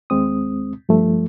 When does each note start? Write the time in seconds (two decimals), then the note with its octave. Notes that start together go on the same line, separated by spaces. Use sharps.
0.10 D#2 G#3 C4 D#6
0.89 G2 F3 A3